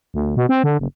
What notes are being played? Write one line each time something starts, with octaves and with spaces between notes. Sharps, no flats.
D2
B2
C4
D3
F#1